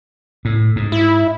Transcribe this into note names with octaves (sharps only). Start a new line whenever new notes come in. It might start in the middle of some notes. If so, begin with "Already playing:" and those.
A2
G#2
E4